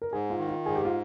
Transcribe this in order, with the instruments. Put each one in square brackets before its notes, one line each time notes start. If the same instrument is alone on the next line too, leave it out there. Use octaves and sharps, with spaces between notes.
[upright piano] A#4
[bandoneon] G#2 [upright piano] G#4
[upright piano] F4
[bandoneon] D#3
[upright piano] F4
[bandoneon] G#2 [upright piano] G#4
[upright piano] G4
F4